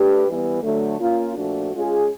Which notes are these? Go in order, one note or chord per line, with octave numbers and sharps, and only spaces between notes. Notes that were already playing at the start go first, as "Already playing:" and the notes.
Already playing: A3 D4 G4 B4
E3 G3 B3
D3 F#3 A3
A#3 C#4 F4
A#2 F3 A3 D4 F#4
G#3 C#4 F4 G#4